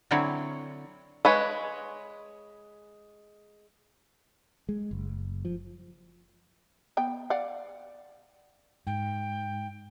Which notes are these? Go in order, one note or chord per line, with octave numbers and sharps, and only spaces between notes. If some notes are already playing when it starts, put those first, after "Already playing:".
D3 F#3 C4 E4 C#5
G#3 B4 C#5
G#3
F#1
F3
B3 G5
D5 F5 F#5
G#2 G5